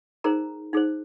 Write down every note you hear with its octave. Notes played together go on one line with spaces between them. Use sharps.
D#4 G#4 A#4 C5 A#5
D#4 G#4 C5